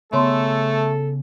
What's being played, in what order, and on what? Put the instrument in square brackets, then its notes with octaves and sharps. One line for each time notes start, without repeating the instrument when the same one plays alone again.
[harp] C#3 [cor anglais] A3 [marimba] B3 C#5 C6 [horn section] A4